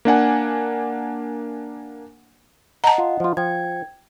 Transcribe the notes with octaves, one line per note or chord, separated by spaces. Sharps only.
A#3 D4 F#5 G#5
D#5 F#5 A5 A#5
F4
F3 F4
F3 G5 G#6